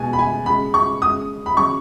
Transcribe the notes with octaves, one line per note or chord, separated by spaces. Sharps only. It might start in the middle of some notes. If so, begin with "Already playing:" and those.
Already playing: B2 G#3 G#5
B5
G#5
C#3 G#3 B5
C#6
C#3 G#3 D#6
B5
C#3 F#3 C#6